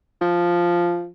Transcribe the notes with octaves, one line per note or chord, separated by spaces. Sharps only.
F3